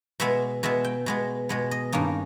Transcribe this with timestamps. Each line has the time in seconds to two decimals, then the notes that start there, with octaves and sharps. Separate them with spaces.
0.20 B2 G#3 B3 E5
0.63 B2 G#3 B3 E5
0.84 G5
1.06 B2 G#3 B3
1.49 B2 G#3 B3
1.71 D#5
1.92 G2 D#3 A#3 C#4 D#5